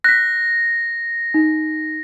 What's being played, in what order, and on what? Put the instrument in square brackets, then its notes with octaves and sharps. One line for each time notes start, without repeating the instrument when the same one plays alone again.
[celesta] F#6 B6 [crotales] A#6
[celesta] D#4